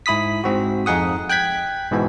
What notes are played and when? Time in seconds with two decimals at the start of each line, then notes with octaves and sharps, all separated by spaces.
0.06 G#2 E4 B5 D#6 B6
0.44 G#2 C4 F#4
0.86 F2 D#4 G#4 F#5 D#6
1.30 G5 F#6 G#6 B6
1.91 G#2 B2 E3 B3